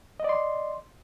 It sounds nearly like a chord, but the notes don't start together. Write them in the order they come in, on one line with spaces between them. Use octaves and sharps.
D#5 D5 C6